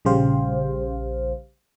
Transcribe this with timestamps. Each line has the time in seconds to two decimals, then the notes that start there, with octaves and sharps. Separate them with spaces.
0.05 A#1 C#3 G3 G4 C5 F5